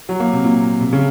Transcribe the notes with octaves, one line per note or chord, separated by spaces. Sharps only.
F#3
A#3
C3
A#2
C3
C#3